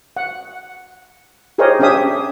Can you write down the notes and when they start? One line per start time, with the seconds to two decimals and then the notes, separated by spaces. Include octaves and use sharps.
0.16 F#5
1.58 G4 G#4 A#4 C5 C#5 D#5
1.79 C#4 D4 G4 G#4 E5 D#6